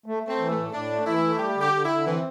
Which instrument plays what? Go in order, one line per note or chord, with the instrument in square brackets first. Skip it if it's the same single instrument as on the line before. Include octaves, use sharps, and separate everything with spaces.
[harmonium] A3
A3
[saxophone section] C4
[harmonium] E3
[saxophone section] A3
[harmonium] A2
[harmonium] A2 [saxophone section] D4
[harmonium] A3
[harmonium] E3 [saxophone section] E4
[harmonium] A3
[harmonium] G3 [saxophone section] G4
[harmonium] D3
[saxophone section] G4
[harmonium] D3
[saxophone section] E4
[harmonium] D3
[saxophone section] E3 [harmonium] C4